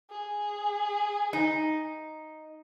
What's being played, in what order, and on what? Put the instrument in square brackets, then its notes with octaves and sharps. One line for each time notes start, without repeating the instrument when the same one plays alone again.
[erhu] G#4
[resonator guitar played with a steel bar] D#4